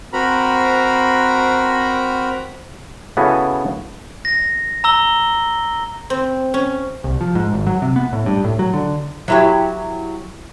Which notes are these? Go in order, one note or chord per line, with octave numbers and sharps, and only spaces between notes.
C4 F#4 A#4 A#5 B5
C#3 B3 E4 F#4 A4 G#5
A#6
A#5 E6 G7
C4
C#4
C2
F3
G#2
G#1
F#3
C3
B3
A2
G2
A2
F#3
D3
F#3 E4 G4